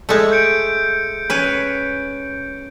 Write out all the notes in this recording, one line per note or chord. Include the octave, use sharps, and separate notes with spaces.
G#3 A3
G6 C#7 D7
C#4 B4